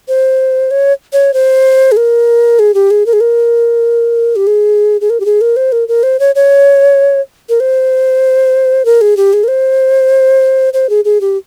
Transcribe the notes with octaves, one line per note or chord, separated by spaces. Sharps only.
C5
C#5
C#5
C5
G#4
A#4
G#4
G4
G#4
A#4
G#4
A#4
G4
G#4
G#4
A#4
G4
G#4
A#4
C5
A#4
A#4
C5
C#5
C#5
A#4
C5
A#4
G#4
G4
G#4
A#4
C5
C5
G#4
G#4
G4